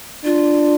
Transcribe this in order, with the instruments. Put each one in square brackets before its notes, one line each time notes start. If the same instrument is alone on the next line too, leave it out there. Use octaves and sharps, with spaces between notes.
[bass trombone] D4 [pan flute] F4